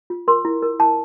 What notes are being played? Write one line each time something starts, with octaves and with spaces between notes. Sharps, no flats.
F4
A#4 C6
E4
A#4
E4 A5